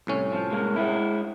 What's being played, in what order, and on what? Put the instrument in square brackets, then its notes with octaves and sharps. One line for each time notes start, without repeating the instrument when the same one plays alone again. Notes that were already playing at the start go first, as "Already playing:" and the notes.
[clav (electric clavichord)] C2 A2 C#4
[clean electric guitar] F3
G#3 A#3
G#3 E4